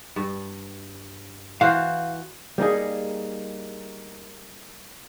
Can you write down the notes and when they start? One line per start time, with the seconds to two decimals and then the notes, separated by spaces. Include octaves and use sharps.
0.16 G2
1.61 E3 F#4 C5 F5
2.58 G3 A#3 D#4 G#4